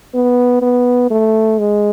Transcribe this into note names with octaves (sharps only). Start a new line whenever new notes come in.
B3
B3
A3
G#3